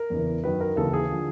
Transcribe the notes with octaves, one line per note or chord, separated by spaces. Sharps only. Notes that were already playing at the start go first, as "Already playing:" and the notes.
Already playing: A#4
E2 C#3 E3
F#2 D#3 F#3 B4
A#4
D#2 C#3 E3 A4
G#4
D3 F3